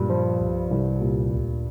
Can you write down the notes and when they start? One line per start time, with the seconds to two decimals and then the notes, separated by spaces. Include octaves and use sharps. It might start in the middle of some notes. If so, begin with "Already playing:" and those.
Already playing: G2 A#2 G3
0.10 F3
0.40 C2
0.70 C2
1.01 A#2
1.31 D2